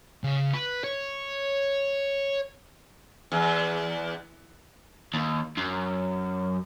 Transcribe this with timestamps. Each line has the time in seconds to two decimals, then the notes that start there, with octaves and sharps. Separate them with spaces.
0.24 C#3
0.53 B4
0.84 C#5
3.32 E2
5.14 D#2
5.57 F#2